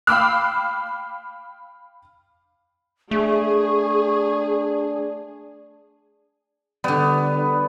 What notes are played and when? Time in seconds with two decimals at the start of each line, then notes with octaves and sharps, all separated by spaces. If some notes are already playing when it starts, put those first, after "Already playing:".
0.07 F5 G5 B5 D6 E6 F6
3.11 A3 D4 G#4 C#6
6.84 D3 G3 B3